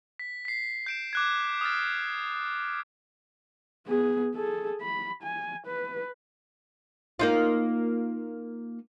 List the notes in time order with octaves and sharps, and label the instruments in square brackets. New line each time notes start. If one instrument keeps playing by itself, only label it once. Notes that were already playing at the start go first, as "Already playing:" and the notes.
[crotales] B6
B6 C7
G6 D7 E7
D6 F#6 G#6
D#6 F6 A6
[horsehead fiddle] B3 G#4
G#4 A4
B5
G#5
B4
[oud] A#3 D#4 F4